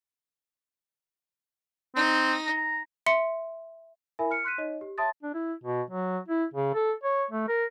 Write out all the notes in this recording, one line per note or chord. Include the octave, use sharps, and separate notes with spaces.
C4 D#4
A#5
E5 C6 C#7
E4 A#4 E5 G#5 B5
F6 C#7
C6 F#6 B6 D#7
D#4 C#5 D#5
G4
C#5 E5 A5 C6 D#6 A6
D4
E4
B2
F#3
E4
C#3
A4
C#5
A3
A#4